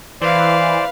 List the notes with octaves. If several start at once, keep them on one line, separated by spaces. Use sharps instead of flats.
E3 B4 C5 D5 F5